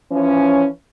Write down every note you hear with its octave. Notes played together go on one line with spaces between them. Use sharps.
E3 F3 C#4